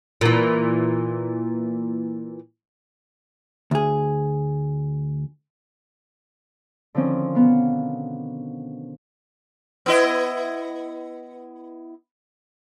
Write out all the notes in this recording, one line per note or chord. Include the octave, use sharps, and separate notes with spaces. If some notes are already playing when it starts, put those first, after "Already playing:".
A#2 E3
D2 G#4
D3 D#3 F3 C4 C#4
B2 B3 F5
B3 E4 D#5